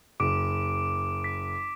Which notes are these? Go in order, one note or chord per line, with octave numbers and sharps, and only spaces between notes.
F#1 D6 D7
B6